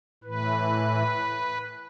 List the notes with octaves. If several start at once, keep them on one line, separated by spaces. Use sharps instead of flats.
A2 E3 B4